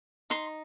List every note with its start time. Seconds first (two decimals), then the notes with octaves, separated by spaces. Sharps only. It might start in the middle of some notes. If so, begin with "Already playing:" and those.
0.30 D#4 C6